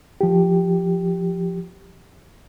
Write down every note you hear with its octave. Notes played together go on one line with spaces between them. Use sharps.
F3 G4